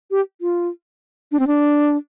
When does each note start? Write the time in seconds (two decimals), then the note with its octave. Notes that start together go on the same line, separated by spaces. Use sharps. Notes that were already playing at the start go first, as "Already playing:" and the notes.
0.11 G4
0.41 F4
1.32 D4
1.39 C4
1.47 D4